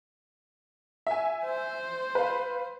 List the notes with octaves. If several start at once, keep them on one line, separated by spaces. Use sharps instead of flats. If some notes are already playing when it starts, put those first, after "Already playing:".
E5 G#5
C5
B4 F5